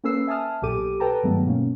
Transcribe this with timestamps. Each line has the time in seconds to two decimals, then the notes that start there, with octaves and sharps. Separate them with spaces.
0.04 A#3 C#4 A4 B4 E6 C7
0.27 E5 G#5 A5 D#6 F6
0.62 B1 A#2 G4 A4 D6 D#7
1.00 A4 B4 G5 A5 A#5
1.23 G2 D#3 F#3 G#3 A3 B3
1.46 B2 A#3 C#4